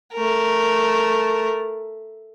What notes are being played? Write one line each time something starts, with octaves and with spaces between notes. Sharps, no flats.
A3 A#4